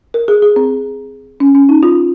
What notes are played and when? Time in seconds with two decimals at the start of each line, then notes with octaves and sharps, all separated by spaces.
0.14 A#4
0.28 G#4
0.42 G#4
0.56 C4
1.40 C#4
1.55 C#4
1.69 D#4
1.83 F4